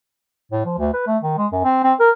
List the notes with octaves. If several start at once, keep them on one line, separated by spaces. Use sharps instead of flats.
A2
F3
D2
B4
A3
D#3
G#3
F#2
C4
C4
A#4